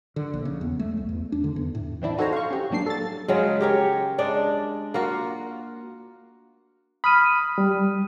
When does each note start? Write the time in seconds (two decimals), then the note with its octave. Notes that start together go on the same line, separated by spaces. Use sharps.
0.16 D3
0.33 A#1
0.45 C#3
0.61 E2
0.79 A3
0.97 C2
1.09 E2
1.32 D4
1.44 D3
1.56 E2
1.75 A2
2.02 E3 C4 D4 E4
2.18 D#4 F#4 A4 C5 C#5 A#5
2.33 F5 C#6
2.51 C#4 G4
2.70 A1 F#3 A#3 D4 C7
2.86 A4 A6
3.28 C#3 F#3 G#3
3.60 G4 A#4 C#5
4.18 G#3 D4 D5
4.94 A#3 F4 F#4
7.04 B5 D#6 F6 D#7
7.58 G3